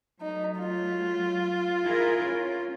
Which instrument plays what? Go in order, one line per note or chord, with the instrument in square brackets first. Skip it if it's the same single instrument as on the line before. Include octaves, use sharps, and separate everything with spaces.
[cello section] F#3 A3 [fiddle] D#4
[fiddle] F4
[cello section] E4 G#4 A#4
C#4